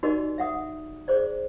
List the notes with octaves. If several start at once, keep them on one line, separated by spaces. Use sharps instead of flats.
D#4 F#4 G4 A#4 D5 D#5
E5 F#5 D#6
G#4 C5 D5